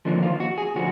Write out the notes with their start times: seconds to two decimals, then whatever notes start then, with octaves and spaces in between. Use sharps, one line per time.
0.05 D#2 D3 F3 D4
0.23 F4
0.40 F#4
0.58 G#4
0.76 D3 F3 F#4